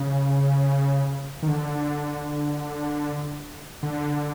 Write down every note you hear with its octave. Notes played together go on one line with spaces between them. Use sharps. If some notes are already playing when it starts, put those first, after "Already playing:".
Already playing: C#3
D#3
D3
D3